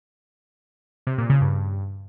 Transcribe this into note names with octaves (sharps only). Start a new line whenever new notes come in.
C3
A#2
C#3
G2